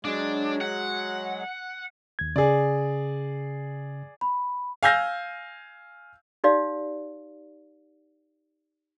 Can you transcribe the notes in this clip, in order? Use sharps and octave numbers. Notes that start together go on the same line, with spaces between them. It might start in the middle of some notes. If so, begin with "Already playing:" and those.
F#3 G#3 D4
F#5
D#2 G#6
C#3 G#4 D5
B5
F5 G#5 E6 G6 A#6
D#4 G4 D5 F5